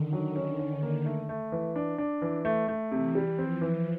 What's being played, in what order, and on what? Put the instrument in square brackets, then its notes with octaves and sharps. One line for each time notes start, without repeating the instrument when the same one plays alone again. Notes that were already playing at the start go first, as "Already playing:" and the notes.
Already playing: [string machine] D3 D#3
[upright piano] F#3
C#4
C#4
A#3
A3
A3
E3
D4
D4
E3
A3
A3
[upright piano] C3 [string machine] E3
[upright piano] G3
[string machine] F3 [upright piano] C4
[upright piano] E3